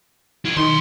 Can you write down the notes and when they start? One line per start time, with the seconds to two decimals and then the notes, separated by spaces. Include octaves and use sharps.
0.45 E4 A#4
0.57 B1 D#3 C6